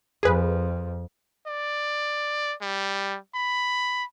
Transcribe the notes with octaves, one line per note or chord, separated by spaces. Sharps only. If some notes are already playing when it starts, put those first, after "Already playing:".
F2 G#4 B4
D5
G3
B5